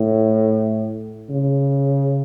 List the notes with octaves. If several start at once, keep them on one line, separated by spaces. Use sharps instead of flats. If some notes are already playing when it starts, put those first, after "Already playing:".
Already playing: A2
C#3